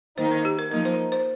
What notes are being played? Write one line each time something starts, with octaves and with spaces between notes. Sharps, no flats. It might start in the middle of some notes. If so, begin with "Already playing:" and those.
D#3 A#3 D#4 C5
A#4
G4
A#4
F3 A#3 D#4 A#4
C5
C5